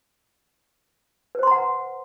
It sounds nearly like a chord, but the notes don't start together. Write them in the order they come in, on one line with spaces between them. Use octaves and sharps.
B4 C5 C6 A#5 F#5